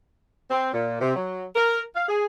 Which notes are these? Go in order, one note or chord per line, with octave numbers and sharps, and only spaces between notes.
C4
A#2
C3
F#3
A#4
F5
G#4